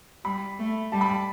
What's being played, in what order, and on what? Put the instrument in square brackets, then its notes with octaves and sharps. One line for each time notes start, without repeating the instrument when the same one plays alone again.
[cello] G3 [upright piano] B5
[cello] A3
[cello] G3 [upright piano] A5
[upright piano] B5
A5